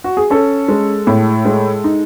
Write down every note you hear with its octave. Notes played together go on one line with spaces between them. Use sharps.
F#4
G#4
C#4 A4
G#3
A2
G#3
D#4